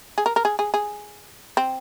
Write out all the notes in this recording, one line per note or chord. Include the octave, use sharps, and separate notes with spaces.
G#4
A#4
A#4
G#4
G#4
G#4
C4